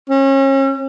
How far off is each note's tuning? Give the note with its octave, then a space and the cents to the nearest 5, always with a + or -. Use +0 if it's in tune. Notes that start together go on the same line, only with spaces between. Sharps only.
C#4 -35